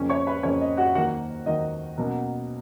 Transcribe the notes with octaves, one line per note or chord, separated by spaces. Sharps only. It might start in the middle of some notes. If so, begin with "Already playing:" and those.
Already playing: F2 C#3 F3 A#3 C#4
C#5 C#6
B4 B5
F2 C#3 F3 A#3 C#4 C#5
D#5
F#4 F#5
D#2 D#3 F#3 A#3 F#4 F#5
D#2 D#3 F#3 A#3 D#5
B2 F#3 A#3 C#4